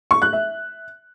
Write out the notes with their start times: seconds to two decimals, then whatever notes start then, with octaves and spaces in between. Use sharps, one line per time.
0.11 C#6
0.22 F#6
0.33 E5